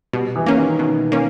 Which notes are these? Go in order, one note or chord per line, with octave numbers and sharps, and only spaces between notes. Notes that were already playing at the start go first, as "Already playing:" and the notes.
B2 G3
E3
A#3 C#4
D#3
B2
A#3 C#4